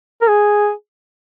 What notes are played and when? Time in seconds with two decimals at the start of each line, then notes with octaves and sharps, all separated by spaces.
0.22 A#4
0.28 G#4